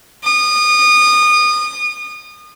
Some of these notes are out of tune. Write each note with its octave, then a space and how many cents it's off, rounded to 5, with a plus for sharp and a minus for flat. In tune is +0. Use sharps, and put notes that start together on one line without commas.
D#6 -30